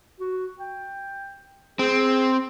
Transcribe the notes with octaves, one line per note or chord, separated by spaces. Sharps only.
F#4
G5
C4 G#4